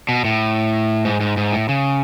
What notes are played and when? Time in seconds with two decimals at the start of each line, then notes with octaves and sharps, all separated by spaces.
0.09 B2
0.25 A2
1.05 G#2
1.21 G#2
1.37 G#2
1.52 A2
1.69 C#3